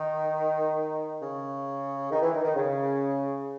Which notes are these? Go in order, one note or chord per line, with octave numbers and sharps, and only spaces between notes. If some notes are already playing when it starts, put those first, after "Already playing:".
Already playing: D#3
C#3
D#3
E3
D#3
D#3
C#3